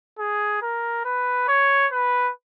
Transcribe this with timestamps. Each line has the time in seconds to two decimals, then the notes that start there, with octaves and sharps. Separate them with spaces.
0.19 G#4
0.62 A#4
1.05 B4
1.48 C#5
1.92 B4